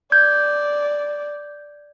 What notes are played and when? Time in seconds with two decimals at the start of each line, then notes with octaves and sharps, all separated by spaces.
0.12 D5 G6 G#6